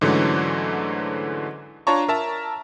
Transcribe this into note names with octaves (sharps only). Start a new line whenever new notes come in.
G#2 D3 E3 F#3 A3 C#4
D4 F4 C#5 A5 A#5 C#6
A#4 E5 A5 A#5